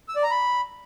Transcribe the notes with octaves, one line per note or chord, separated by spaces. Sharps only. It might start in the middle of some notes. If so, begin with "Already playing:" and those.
E6
D5
A#5
B5